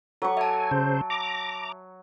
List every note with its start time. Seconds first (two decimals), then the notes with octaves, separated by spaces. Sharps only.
0.22 F#3 A4 C#6
0.37 E5 G#5 A5
0.71 C#3 C5
1.10 A#5 D6